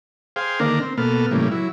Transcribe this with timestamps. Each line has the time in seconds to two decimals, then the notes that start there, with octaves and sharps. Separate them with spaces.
0.36 G#4 C5 F5 G5
0.60 D3 D#3 A#3 D4 A#4
0.81 C4
0.98 B2 A#3 B3 A4 F6
1.31 A2 C#3 E3 G3 A#3
1.51 F#3 E4